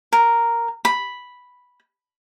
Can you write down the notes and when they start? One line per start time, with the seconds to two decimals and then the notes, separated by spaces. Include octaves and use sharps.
0.13 A#4
0.85 B5